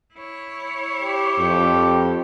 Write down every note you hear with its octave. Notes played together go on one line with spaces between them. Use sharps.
E4 C#5
G4
F2